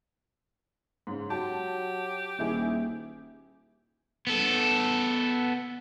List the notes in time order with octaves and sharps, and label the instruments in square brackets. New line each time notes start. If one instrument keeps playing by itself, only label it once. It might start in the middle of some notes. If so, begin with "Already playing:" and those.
[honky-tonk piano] G#2 C#3
[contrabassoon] F#3 [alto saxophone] G4 [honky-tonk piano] A5
[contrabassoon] D#1 [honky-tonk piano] D#3 E4 G#4
[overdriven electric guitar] B3 A4